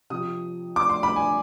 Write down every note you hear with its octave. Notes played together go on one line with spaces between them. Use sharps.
C3 F3 D#6
D6
C6
B5
G#5